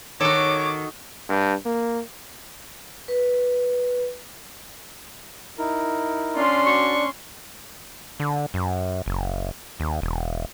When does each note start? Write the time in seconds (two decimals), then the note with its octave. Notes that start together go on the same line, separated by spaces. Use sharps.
0.20 D#3 F#4 A4 C#5 D6
1.29 G2
1.66 A#3
3.08 B4
5.59 D#4 E4 A#4
6.36 C#4 D4 F4 C6
6.66 F#4 D5 C#6
8.20 D3
8.54 F#2
9.06 F#1
9.80 D#2
10.02 E1